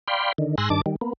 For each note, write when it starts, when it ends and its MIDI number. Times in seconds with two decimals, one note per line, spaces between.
0.08 0.32 74
0.08 0.32 77
0.08 0.32 79
0.08 0.32 83
0.08 0.32 84
0.38 0.55 50
0.38 0.55 51
0.58 0.69 44
0.58 0.69 80
0.58 0.69 84
0.58 0.69 88
0.58 0.69 90
0.58 0.69 94
0.70 0.81 43
0.70 0.81 51
0.70 0.81 62
0.70 0.81 81
0.70 0.81 86
0.86 0.96 51
0.86 0.96 55
1.01 1.13 58
1.01 1.13 59